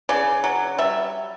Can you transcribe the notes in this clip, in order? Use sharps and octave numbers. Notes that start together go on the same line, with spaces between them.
C#3 D5
F#3
G3 E5